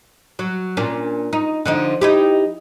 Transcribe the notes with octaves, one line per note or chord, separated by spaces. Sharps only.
F#3
A#2 C#4 D4
D#4
D3 F3 D#4
D#4 E4 G4